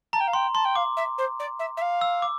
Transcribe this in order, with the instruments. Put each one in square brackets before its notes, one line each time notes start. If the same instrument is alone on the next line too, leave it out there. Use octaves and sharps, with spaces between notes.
[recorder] A5 [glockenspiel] A#5
[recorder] G5
F5
[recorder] G5 [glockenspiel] C6
[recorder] A5 [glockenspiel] C6
[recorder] G5
[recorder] F5 [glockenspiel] D6
[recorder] E5
C5
D5
E5
E5
F5
[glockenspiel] E6
D6